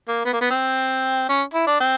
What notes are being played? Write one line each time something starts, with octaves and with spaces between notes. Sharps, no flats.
A#3
B3
A#3
B3
C4
C#4
E4
D4
C4